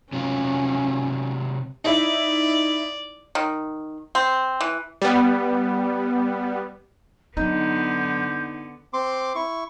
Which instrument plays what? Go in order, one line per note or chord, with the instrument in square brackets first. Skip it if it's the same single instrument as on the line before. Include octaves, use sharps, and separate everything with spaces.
[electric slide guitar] C3 F#3 F4 [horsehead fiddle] C#4
[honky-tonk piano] D#4 E4 [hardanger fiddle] D5
[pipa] D#3
C4
E3
[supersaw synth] G3 B3
[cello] D3 B3 [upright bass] F#3 C4 [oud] D#4 [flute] G6
[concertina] C4 C6 D6
E4 C#6